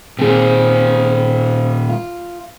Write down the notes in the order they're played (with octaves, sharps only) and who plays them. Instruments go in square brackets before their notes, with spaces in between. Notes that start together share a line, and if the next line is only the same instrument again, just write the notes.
[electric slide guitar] A#2 D#3 [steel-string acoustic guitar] C4 G#4
[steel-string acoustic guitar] F4